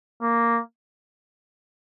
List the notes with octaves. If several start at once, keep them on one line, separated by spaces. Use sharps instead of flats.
A#3